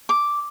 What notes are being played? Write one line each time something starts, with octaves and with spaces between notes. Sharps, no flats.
D6